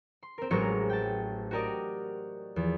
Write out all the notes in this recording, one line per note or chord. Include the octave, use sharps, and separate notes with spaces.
C6
C4 A#4
A1 F#3 G#3 A#4 C5 C#6
G5 A5
F#4 G4 A#4 D5 D#5
E2 F3